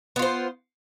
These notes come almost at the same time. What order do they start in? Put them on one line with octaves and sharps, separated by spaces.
B3 F4 C5